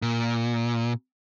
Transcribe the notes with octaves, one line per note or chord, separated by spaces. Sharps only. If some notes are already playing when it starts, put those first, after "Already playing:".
A#2